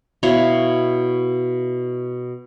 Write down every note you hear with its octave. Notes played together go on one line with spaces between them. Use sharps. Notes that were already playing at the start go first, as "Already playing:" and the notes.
B2 E4 C#5 F5